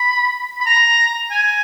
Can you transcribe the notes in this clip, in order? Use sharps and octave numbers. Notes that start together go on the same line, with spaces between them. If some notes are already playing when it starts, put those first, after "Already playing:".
Already playing: B5
B5
A#5
G#5